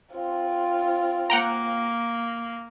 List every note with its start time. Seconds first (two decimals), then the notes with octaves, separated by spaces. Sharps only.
0.13 C4 F4
1.30 A#3 F#5 G5 A#5